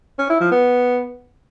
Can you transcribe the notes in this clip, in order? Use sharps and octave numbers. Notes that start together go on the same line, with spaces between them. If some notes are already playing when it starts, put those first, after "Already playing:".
C#4
E4
F3
B3